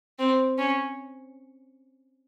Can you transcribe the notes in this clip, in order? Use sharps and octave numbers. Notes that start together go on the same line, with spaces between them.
C4
C#4